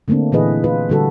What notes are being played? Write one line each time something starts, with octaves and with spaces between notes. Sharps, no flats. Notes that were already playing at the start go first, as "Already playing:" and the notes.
D3 A3 A#3 C4 D4
A#2 E3 E4 G#4 B4 D#5
F4 B4
D3 G3 F#4 A4